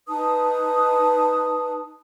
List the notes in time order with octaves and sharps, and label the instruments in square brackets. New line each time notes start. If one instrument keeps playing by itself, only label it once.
[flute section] D#4 B4 A5 D#6